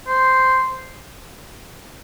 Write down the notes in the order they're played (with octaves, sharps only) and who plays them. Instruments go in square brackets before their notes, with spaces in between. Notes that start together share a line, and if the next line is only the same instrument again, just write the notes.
[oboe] C5